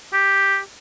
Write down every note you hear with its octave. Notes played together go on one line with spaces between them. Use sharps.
G4